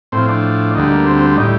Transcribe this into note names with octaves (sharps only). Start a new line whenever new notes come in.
A2 C4
F3
D4
D2 D3 G3 D#4
A#3
C4
C4
A2 G3 D#4